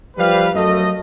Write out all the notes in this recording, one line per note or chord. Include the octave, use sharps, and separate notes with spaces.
F3 G3 B4 F5
F#2 F#3 A3 A4 D#5